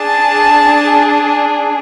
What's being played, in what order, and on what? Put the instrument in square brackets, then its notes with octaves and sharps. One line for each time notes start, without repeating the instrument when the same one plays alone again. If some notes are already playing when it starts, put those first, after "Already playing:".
Already playing: [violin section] D4 G#4 A5